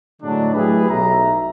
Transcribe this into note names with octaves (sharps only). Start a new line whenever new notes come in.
A2 D3 F#3 G#3 D4
F#3 A3 E4 G4 G#4 B4
B1 E5 A#5